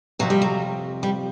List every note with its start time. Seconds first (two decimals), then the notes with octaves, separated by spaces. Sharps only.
0.19 F2 C3 F3 F#3
0.30 G3
0.42 F#3
1.03 G3